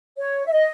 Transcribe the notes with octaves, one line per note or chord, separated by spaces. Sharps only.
C#5
E5
D#5